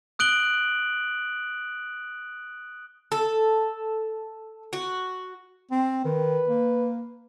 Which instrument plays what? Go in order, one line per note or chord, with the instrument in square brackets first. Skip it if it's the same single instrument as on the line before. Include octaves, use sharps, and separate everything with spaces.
[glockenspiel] D#6 F#6 D7 F#7 G7
[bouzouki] A4
F#4
[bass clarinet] C4
[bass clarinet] D#3 [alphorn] B4
[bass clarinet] A#3